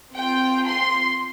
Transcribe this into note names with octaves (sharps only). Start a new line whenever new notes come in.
C4 F4 G5
C6